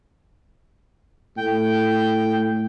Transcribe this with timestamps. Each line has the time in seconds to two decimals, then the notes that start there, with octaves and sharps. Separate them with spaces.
1.37 A2 G5